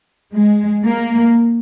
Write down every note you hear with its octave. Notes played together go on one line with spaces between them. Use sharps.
G#3
A#3